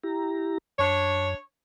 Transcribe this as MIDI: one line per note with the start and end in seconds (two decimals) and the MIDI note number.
0.03 0.58 64
0.03 0.58 67
0.03 0.58 82
0.79 1.34 42
0.79 1.33 62
0.79 1.33 73